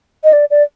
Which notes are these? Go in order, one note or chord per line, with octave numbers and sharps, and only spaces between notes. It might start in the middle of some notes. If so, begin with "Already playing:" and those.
D#5
D5
D5